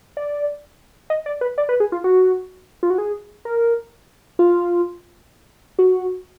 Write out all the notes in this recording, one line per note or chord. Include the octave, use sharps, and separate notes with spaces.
D5
D#5
D5
B4
D5
B4
G#4
F4
F#4
F4
F#4
G#4
A#4
F4
F#4